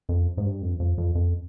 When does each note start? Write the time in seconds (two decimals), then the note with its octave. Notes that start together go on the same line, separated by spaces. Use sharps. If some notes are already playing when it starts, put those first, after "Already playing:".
0.09 F2
0.37 G#2
0.44 G2
0.62 F2
0.80 F2
0.98 F2
1.15 F2